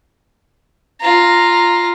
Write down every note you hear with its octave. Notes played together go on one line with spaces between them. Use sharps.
F4 A#5